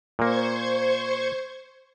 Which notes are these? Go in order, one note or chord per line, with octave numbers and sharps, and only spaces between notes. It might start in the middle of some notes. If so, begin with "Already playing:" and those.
A#2 A#3 C5 C#6 G#6